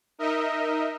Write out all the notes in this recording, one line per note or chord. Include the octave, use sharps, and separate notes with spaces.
D#4 A#4 D#5 E5